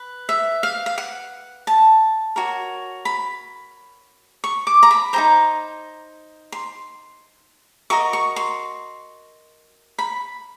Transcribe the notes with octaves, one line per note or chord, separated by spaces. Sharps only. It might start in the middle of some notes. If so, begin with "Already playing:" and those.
Already playing: B4
E5
F5
F5
F#5
A5
F#4 A#4 C#5
B5
C#6
D6
A#5
B5
D#4 G#4 C5 A#5
C6
F#4 A#4 D#5 C#6
C#6
C6
B5